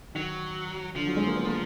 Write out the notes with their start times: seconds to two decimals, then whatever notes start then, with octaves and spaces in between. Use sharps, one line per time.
0.15 D#3 F#3
0.96 D3 F3
1.07 F#3
1.17 G#3
1.27 A#3
1.36 B3
1.47 A#3